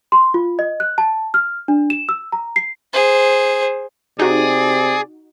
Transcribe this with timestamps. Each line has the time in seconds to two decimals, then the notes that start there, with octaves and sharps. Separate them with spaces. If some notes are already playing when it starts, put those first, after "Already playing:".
0.12 C6
0.34 F4
0.59 D#5
0.80 F#6
0.98 A5
1.34 F6
1.68 D4
1.90 E7
2.09 E6
2.32 A#5
2.56 C7
2.93 G#4 C5
4.20 C3 D#4 F#4 G#4 D5